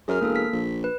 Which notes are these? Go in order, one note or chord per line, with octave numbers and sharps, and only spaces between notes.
F#2 G#4 A#4 F6
E1 A#3 A4
B6
A#1
B4